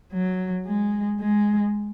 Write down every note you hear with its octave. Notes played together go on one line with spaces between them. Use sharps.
F#3
G#3
G#3